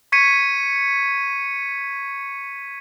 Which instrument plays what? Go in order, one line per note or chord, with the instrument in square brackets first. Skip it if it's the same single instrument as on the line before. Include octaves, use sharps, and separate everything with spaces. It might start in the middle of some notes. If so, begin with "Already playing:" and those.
[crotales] C#6 G#6 B6 C#7 D#7